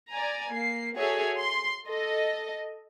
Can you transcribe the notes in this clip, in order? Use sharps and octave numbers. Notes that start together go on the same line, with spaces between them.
D5 G#5 A#5
A#3 C7
F#4 G#4 A4 C#5 E5 G#5
C6
A4 D#5